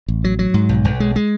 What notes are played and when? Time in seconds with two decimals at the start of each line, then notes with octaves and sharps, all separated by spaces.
0.08 A1
0.24 F#3
0.39 F#3
0.54 G#2
0.69 B1
0.85 B1
1.00 G#3
1.16 G#3